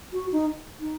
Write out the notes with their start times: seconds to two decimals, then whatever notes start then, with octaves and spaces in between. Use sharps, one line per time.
0.13 F#4
0.32 D#4
0.81 D#4